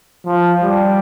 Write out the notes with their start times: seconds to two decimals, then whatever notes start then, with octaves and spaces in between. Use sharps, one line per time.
0.26 F3
0.62 G3